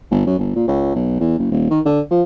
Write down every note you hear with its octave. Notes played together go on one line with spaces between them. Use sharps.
G1
F#2
G1
A#2
C#2
B1
E2
F#1
D#1
D#3
D3
F3